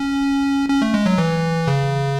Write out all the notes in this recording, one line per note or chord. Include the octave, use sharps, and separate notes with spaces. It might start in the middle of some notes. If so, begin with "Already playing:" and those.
Already playing: C#4
C#4
A3
G#3
F#3
E3
C#3